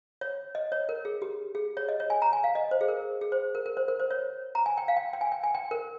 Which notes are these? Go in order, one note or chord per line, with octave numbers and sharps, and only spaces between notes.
C#5
D#5
C#5
A#4
G#4
G4
G#4
C#5
D#5
C#5
G#5
A#5
G#5
F5
D#5
C5
G#4
A#4
G#4
C5
A#4
A#4
C5
A#4
C5
C#5
A#5
G#5
G5
F5
G5
G5
G#5
G5
G#5
G5
A#4